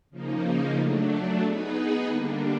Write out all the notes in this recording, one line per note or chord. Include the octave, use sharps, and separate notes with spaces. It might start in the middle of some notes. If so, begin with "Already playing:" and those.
C#3 F3 A#3 D#4
F#3 A3 D4
B3 D#4 G#4 B4
D3 G3 A#3 D4